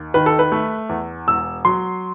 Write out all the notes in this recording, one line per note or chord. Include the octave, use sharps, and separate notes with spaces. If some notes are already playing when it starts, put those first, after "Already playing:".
Already playing: D#2
D#3 B4
A4
B4
A3
E2
E1 E6
F#3 C6